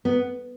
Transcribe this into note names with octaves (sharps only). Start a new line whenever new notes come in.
B3